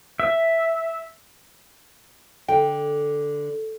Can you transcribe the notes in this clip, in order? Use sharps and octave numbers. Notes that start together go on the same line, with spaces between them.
E5
D3 G5